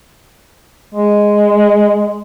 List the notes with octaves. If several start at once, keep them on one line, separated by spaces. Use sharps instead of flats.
G#3